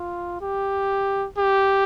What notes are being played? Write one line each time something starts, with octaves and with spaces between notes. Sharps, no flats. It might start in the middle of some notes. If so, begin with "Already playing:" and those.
Already playing: F4
G4
G4